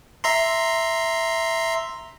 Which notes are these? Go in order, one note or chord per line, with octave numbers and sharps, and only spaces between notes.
E5 A#5 C6